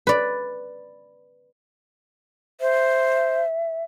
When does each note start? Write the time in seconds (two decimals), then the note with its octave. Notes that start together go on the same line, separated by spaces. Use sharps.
0.07 B4 D5
2.61 C5 E5